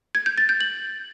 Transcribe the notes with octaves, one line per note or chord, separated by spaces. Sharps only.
G#6
G6
A6
G6
F#7